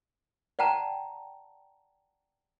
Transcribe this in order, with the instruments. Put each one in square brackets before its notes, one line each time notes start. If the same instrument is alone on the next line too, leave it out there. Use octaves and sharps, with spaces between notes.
[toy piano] D5 F#5 G5 A5 A#5